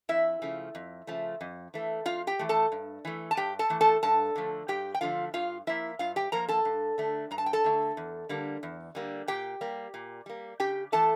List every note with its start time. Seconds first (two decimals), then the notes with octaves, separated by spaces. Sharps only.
0.09 F2 E4 E5
0.42 C#3 F3 A3
0.75 F2
1.07 C#3 F3 A3
1.41 F2
1.74 E3 A3
2.05 F2 F4 F5
2.27 G4 G5
2.39 E3 A3
2.49 A4 A5
2.72 G2
3.05 E3 A3
3.31 A5
3.37 G2 G4 G5
3.59 A4 A5
3.70 E3 A3
3.81 A4 A5
4.03 G2 A4 A5
4.36 D3 F3 A3
4.68 G2 G4 G5
4.94 G5
5.01 D3 F3 A3 F4 F5
5.34 G2 F4 F5
5.67 F3 A#3 E4 E5
5.99 G2 F4 F5
6.16 G4 G5
6.32 F3 A#3 A#4 A#5
6.48 A4 A5
6.65 G2
6.98 D3 A3
7.31 G2 A#5
7.38 A5
7.46 G5
7.53 A4 A5
7.64 D3 A3
7.97 E2
8.29 D3 G3 A#3
8.63 E2
8.95 D3 G3 A#3
9.28 A#2 G4 G5
9.61 G3 A#3
9.94 A#2
10.26 G3 A#3
10.60 C#3 G4 G5
10.92 E3 A3 A4 A5